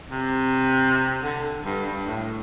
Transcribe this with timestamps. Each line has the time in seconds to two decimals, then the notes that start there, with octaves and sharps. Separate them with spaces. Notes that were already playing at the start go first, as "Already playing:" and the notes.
0.11 C3
1.22 D3
1.65 G2
1.86 G2
2.06 A2